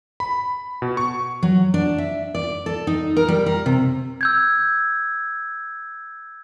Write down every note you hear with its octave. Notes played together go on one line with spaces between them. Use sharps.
B5
B2
C#6
F#3
D4
E5
D5
A4
D#4
A#4
G3
A#4
C3
E6 G6 G#6